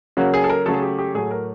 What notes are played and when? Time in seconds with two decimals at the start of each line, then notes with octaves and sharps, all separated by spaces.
0.17 C#3 F#3 A#3 F#4
0.34 G#4
0.44 A4
0.49 A#4
0.66 C#3 F#3 A3 A4
0.74 G#4
0.82 G4
0.99 G4
1.14 A2 F#3 A3 G#4
1.31 A#4